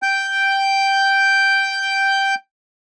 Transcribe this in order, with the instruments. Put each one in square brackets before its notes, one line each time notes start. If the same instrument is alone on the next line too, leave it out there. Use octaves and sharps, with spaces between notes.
[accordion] G5 G6